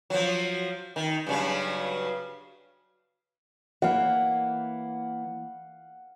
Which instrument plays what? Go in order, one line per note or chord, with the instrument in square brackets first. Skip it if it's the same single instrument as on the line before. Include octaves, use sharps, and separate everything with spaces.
[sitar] F3 F#3
D#3
G2 C#3 F#3
[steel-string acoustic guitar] E3 A#3 [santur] F5 F#5